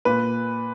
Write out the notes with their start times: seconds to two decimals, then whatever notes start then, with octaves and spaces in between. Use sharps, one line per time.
0.05 A#2 B4